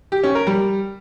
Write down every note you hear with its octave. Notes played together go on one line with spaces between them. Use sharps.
G4
C#4
A#4
G3